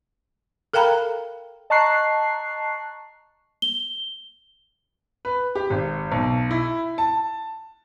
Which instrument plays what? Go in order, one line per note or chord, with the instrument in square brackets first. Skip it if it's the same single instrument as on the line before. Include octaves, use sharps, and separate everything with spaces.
[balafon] A4 A#4 F5 G5 A#5 B5
[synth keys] D#5 A5 A#5 C#6 F#6 C7
[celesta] G7
[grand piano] B4
G4
G#1
B1
E4
A5